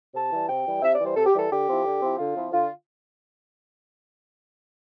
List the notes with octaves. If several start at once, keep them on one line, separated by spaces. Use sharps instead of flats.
C3 A5
E3 G3
C3 G5
E3 G3
C3 E5
E3 D5
G3 C5
C3 A4
G4
E3 G3 A4
D3 G4
F3 C4 E4
D3
F3 C4 E4
D3 F4
F3 C4 E4
D3 F4